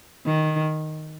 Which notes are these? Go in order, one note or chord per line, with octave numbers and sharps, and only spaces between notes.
D#3